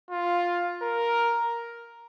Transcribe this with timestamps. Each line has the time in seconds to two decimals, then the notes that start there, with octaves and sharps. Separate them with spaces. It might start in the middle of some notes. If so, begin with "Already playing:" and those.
0.10 F4
0.82 A#4